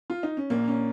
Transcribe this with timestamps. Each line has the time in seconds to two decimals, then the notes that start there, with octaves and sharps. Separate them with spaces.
0.10 F4
0.23 D#4
0.37 C#4
0.50 A#1 A#3
0.68 C#4